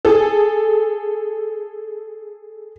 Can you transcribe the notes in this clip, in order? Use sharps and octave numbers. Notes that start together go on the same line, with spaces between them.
G#4 A4